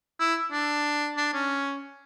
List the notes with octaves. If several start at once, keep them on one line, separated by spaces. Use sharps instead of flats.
E4
D4
D4
C#4